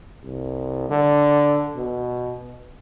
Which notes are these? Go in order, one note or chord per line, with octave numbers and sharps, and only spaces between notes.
C2
D3
B2